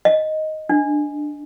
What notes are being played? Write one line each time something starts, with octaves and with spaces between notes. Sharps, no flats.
D#5
D4